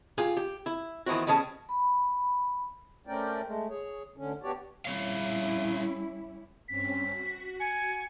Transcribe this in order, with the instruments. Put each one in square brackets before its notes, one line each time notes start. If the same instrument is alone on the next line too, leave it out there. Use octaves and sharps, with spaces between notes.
[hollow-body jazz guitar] F4 G4 G#4
G4
E4
D#3 E3 B3 C4 F#4
B2 G3 C#4 G#4 A5
[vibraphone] B5
[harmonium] A3 C4 C#4 A#4 D5 G5
G#3 A3
G#4 C#5
D2 D3 C#4
B3 D4 F#4 G4 C#5 D5
[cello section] G3 C#4 E4 [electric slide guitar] C4 C#5 F5
[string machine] G2 C4 C#4 [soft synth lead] B6
[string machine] F#4
[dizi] G#5 [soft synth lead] C#7